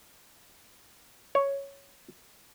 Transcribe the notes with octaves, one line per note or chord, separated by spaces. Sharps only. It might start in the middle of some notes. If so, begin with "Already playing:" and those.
C#5